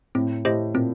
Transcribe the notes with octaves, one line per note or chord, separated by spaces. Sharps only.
A2 C4
A2 G4 C5 D#5
A#2 C4